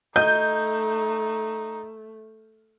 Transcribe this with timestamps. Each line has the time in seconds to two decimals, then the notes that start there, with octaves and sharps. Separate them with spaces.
0.16 A3 D#4 D#5 G6